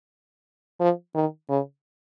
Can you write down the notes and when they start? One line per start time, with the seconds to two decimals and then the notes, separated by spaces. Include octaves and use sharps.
0.80 F3
1.15 D#3
1.49 C#3